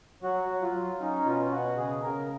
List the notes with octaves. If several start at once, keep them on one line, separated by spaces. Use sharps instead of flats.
F#3 F#4
F#3
F4
F#3
C#4 D#4
B2 F4
B2 F#4
C#3 G#4
C#3 A#4